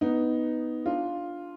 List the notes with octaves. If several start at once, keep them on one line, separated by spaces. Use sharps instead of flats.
B3 D#4
D4 F4